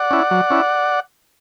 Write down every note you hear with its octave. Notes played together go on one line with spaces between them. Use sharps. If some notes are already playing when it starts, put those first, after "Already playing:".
Already playing: D5 F#5
C#4 E4
F#3
C#4 E4